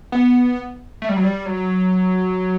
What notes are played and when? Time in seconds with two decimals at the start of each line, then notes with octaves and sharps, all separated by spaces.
0.12 B3
1.02 A3
1.09 G3
1.16 F#3
1.24 G3
1.46 F#3